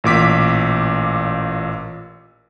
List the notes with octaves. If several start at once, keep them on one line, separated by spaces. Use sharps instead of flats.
A1 A#2 D6 B6